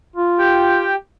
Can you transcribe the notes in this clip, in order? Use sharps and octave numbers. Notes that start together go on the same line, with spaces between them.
F4
G4 G5